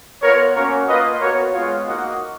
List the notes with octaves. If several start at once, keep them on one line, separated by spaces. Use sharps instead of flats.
B3 F4 A#4 C#5
A#3 C#4 F#4 A#4 C#5
A#3 F4 B4 D#5
B3 F#4 A#4 C#5
G#3 B3 F4 C#5 F5
A#3 D#4 F#4 D#5 F#5